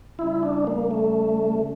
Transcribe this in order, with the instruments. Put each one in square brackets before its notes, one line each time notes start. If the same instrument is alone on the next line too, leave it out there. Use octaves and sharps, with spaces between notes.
[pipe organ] C#3 G3 C#4 [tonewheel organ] E4
[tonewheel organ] D4
A#3
A3